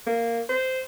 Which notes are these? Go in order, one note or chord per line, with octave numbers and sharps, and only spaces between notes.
A#3
C5